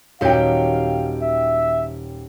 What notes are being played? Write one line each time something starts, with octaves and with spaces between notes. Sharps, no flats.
D#1 D#3 F#3 G4 F5 G5
E5